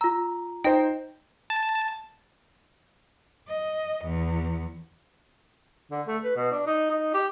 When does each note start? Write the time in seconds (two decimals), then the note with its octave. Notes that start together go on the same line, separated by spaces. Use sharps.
0.01 F4 A#5 E6
0.64 D#4 C5 D#5 G5
1.50 A5
3.48 D#5
4.05 E2
5.91 D3
6.07 A3
6.24 B4
6.36 B2
6.52 D4
6.67 D#4
6.90 D#4
7.14 G4